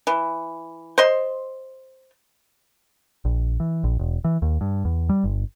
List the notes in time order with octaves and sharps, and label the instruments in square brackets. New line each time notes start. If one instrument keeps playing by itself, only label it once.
[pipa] E3
C5 D#5 C6
[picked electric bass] A#1
E3
A#1
E1
E3
D#2
G2
E2
G3
G1